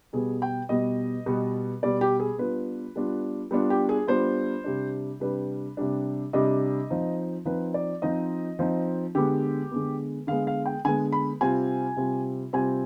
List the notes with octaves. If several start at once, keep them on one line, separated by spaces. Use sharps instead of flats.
B2 G3 B3 G#4
G5
B2 G3 B3 D#5
B2 G3 B3
B2 G3 B3 D5
G4
G#4
G3 B3 D4 F4 B4
G3 B3 D4 F4
G3 B3 D4 F4
G4
G#4
G3 B3 D4 F4 C5
C3 G3 D4
C3 G3 D4 B4
C3 G3 D4
C3 G3 D4 D#5
F3 C4 D#4
F3 C4 D#4 B4
D5
F3 C4 D#4 D#5
F3 C4 D#4
D3 G#3 B3 G4
D3 G#3 B3
D3 G#3 B3 F5
F5
G5
D3 G#3 B3 G#5
B5
C3 G3 C4 F4 G#5
C3 G3 C4 F4
C3 G3 C4 F4 G#5